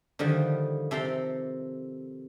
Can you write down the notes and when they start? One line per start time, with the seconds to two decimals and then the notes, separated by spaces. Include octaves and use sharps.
0.19 D3 D#3 F3 G3
0.91 C3 A4 G5 A#5 C6